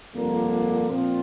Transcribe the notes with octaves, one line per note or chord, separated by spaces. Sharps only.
G1 F2 D3 A#3
A#2 F3 C4